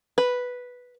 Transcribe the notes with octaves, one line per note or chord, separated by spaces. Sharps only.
B4